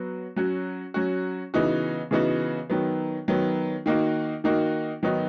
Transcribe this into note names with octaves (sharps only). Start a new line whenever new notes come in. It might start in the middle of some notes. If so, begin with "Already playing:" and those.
Already playing: F#3 B3 F#4
F#3 C#4 F#4
F#3 C#4 F#4
C#3 E3 B3 D#4 F#4
C#3 E3 B3 D#4 F#4
D#3 F#3 B3
D#3 F#3 B3
D#3 A#3 D#4 F#4
D#3 A#3 D#4 F#4
D#3 F#3 B3 D#4 F#4